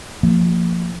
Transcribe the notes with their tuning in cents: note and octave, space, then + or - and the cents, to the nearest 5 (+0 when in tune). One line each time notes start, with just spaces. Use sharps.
F3 +0 A#3 -30